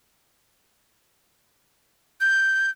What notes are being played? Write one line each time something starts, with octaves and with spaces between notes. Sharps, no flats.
G6